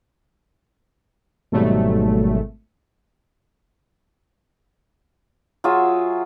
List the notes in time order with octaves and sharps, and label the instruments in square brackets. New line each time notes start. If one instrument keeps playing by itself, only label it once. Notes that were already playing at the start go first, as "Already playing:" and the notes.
[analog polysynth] G#1 A3 [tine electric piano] B2 F#3 G3
[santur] F#3 F4 G#4 E5